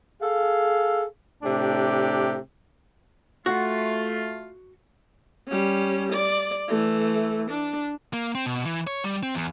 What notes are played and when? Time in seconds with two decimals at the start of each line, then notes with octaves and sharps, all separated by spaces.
0.20 G#4 A4 F5
1.43 A2 C3 D4 G4
3.46 A3 F4 F#4
5.47 G3 C#4
6.12 D5
6.68 E3 A3
7.50 D4
8.13 A#3
8.35 C4
8.46 B2
8.66 E3
8.87 C#5
9.04 G3
9.23 C4
9.35 E2